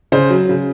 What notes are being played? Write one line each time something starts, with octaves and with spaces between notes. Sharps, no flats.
C#3 C5
F#3
C#3